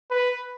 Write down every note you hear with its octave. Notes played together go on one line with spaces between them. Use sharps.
B4